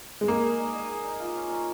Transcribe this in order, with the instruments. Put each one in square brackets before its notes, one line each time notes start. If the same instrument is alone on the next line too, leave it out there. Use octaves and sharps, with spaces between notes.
[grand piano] G#3
[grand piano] A#3 [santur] G#4
[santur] D#4
D#4
D#5
G#4
D#4
F4
C#4
C#4